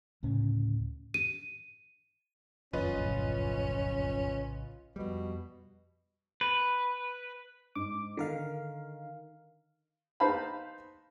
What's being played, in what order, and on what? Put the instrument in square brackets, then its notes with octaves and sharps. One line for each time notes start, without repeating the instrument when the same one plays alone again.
[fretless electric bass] D2 A2 C#3 C#4
[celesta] D#7
[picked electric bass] F1 F#2 [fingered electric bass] D3 D#3 [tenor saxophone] C#4 [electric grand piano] F4 B4 D#5
[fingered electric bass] A#1 A2 C#3
[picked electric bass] F2 G3 [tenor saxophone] B2
[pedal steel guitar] B4
[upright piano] G#2 [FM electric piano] D6
[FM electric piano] D3 A#4 F5 [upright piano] D#3
[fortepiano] D#4 B4 C5 F5 A5 B5